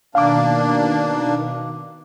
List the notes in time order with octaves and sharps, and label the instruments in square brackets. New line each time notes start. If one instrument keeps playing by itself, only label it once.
[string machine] B2 D#3 [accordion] A#3 D4 [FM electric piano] F5 D6